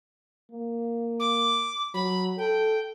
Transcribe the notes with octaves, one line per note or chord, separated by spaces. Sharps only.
A#3
D6
F#3 B5
A4 G5